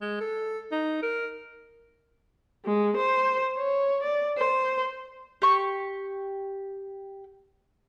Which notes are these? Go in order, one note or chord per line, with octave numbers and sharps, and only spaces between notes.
G#3
A4
D#4
A#4
G#3
C5
C#5
D5
C5
G4 C#6